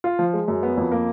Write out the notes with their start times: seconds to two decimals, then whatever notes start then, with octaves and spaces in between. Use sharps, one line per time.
0.04 F4
0.19 F3
0.34 G#3
0.48 F#2
0.63 B3
0.77 F2
0.92 A#3